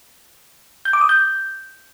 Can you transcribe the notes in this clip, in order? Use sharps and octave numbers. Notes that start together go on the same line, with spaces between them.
G6
D6
D#6
G6